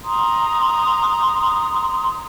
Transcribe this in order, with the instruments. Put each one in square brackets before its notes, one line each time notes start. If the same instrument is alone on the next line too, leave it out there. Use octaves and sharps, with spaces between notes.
[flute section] A#5 C6 D#6